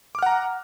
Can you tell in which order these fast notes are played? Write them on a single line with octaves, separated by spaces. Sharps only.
D6 F6 F#5 A#5